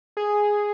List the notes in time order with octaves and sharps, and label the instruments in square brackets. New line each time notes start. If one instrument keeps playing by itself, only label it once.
[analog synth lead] G#4